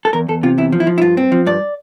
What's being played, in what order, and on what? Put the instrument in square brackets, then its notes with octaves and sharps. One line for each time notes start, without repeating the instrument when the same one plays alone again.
[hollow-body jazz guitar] A4
E2 A#4
E2 A4
C3 F4
E2 E4
F3
E4
F3
E4
G2 F4
C4
F3
G2 D5